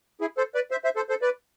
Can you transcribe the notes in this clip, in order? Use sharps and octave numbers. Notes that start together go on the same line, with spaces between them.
E4 G#4
A4 C5
B4 D5
C5 E5
C5 E5
A4 C5
A4 C5
B4 D5